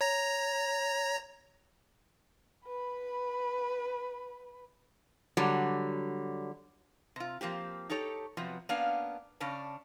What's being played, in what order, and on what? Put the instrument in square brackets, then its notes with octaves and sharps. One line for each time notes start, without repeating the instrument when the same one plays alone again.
[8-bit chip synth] C#5 A#5 A#6
[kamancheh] B4 B5
[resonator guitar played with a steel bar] D3 F#3 G3
C3 F4
F3 A#3 C4 G4
D#4 G4 A4 C#5
C3 F3 F#3 B3
A#3 B3 C#4 D4 F5
C#3 C#4 D4 A5